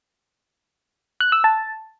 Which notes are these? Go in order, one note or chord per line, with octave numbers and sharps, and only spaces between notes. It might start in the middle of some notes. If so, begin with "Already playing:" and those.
F#6
E6
A5